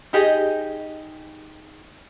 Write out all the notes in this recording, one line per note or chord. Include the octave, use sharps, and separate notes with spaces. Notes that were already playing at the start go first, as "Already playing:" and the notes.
D#4 G4 G#4 D#5